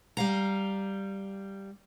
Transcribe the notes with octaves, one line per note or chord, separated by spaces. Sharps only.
G3 F5 A#5